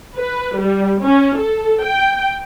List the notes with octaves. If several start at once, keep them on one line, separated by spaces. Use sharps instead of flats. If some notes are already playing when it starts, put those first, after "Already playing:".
B4
G3
C#4
A4
G5